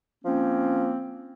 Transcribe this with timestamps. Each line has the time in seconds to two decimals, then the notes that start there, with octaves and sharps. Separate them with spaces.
0.24 F3 A#3 C4 C#4